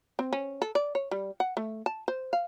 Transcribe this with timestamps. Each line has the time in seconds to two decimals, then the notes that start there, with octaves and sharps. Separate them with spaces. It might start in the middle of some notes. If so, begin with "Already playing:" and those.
0.19 C4
0.33 C#4
0.62 A4
0.75 D5
0.95 C#5
1.11 G3
1.40 F#5
1.57 A3
1.86 A5
2.08 C5
2.33 F5